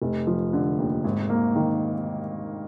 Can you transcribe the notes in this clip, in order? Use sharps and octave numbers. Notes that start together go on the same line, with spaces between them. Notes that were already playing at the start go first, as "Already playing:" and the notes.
F1
F3
D3
D#2
G#1
A#3
D#3